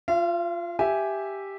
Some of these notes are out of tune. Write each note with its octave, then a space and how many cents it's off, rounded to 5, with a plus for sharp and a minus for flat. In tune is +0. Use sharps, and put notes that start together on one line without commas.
F4 +0 F5 -45
G4 +0 E5 +0 G#5 +0